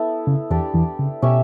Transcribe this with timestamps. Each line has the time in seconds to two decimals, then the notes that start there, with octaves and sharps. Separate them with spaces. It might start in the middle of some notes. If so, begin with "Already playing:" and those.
Already playing: B3 E4 A4
0.27 C#3
0.51 E2 E3 D4 G4 D5
0.74 E2 E3
0.99 C#3
1.22 B2 C#4 G4 C#5 E5